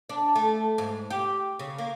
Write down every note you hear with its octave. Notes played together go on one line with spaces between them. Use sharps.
D4
A3
G#2
G4
C#3
A#3